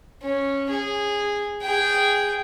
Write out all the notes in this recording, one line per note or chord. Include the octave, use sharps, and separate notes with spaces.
C#4
G#4
G#4 G5